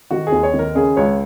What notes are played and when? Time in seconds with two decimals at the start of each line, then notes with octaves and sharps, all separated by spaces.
0.11 D#3 F#4
0.27 G#4
0.32 D#2
0.43 C#5
0.54 D#3
0.59 A#4
0.75 C#3 G#4
0.97 C#2 C#5